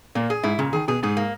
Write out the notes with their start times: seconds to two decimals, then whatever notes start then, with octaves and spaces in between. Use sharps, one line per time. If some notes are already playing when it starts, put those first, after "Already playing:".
0.15 A#2 A#3
0.30 G#4
0.43 G#2 E4
0.58 A#2 C#3
0.73 D#3 G#4
0.88 B2 G#4
1.03 G#2 G#4
1.17 A#3